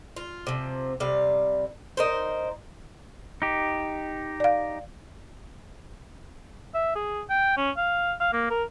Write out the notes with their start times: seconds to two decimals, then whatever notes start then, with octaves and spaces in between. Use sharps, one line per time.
0.17 F4
0.47 C3 F3
1.00 C3 G3 F5
1.97 D#4 A#4 C5
3.42 D#4 G4
4.40 D5 F5
6.74 E5
6.96 G#4
7.30 G5
7.57 C#4
7.77 F5
8.21 F5
8.33 A#3
8.50 A#4